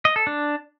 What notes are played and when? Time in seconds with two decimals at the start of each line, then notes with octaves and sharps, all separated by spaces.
0.05 D#5
0.16 A4
0.27 D4